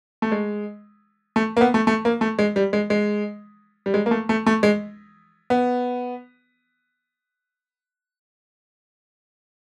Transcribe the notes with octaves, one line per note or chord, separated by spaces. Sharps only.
A3
G#3
A3
A#3
B3
A3
A3
A#3
A3
G#3
G3
G#3
G#3
G3
G#3
A#3
A3
A3
A3
G#3
B3